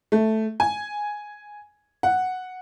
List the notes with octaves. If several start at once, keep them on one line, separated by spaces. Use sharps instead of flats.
A3
G#5
F#5